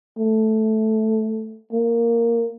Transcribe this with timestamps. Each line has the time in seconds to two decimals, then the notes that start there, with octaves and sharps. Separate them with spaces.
0.18 A3
1.73 A#3